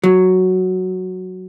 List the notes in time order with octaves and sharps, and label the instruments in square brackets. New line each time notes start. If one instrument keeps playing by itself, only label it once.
[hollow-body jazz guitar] F#3